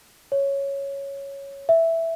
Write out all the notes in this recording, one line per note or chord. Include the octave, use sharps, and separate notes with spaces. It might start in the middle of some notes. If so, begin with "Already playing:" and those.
C#5
E5